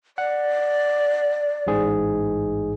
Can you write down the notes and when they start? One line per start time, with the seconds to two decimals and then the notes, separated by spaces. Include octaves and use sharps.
0.18 D5 F#5
1.67 A1 G#2 G#4